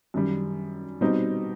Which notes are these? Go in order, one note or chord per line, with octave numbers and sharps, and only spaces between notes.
F#2 D#3 G3
B2 G3 C4 D#4